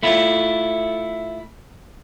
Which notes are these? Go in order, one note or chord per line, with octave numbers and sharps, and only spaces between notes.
A3 E4 F4